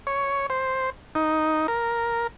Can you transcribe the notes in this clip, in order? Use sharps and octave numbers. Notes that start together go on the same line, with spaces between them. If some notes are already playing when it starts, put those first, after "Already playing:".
C#5
C5
D#4
A#4